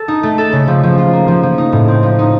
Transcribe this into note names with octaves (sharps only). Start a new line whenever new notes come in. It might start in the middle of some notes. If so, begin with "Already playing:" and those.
Already playing: A4
D#4
A3
A4
C#3
F3
F3
F4
A#3
F3
F3
D#4
A2
C4
F3
D#4